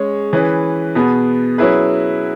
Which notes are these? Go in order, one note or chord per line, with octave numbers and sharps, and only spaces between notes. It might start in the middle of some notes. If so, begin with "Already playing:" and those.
Already playing: G#3 C#4 G#4 C#5
E3 C#4 G#4 B4
B2 B3 G#4
F#3 C#4 E4 G#4 B4